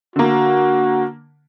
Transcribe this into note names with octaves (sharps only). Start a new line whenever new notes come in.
D3 A#3 F#4